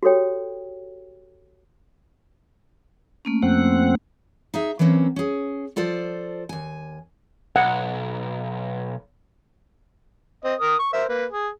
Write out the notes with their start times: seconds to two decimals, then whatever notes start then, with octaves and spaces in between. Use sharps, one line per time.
0.03 F#4 G4 A4 C#5 G5
3.25 A3 A#3 C#4
3.42 F2 C4 F#5
4.54 D#4 G#4 E5
4.79 E3 F#3 A#3 C4 C#4
5.16 C#4 G#4
5.76 F3 F4 A4 C5 D5
6.49 D#2 G#5
7.56 B1 F#5
10.44 C4 D#5
10.59 A#4 D#6
10.79 C#6
10.93 A#4 C5 E5
11.09 A#3 B4
11.31 G#4